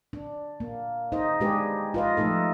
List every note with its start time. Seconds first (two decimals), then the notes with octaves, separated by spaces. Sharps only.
0.13 D4
0.60 A#3
1.12 D#4 G#4 C5 D#5
1.40 G#3 D4 G4 G#4 B4
1.94 F4 B4 D#5
2.17 F3 A3 D#4 A4